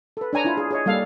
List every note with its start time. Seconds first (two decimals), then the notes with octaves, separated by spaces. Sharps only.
0.17 A4 B4
0.33 D4 C#5 G#5 A#5
0.45 D4 E4 F4
0.57 G#4
0.71 G#4 C#5 D#5
0.86 G3 A#3 A4 F5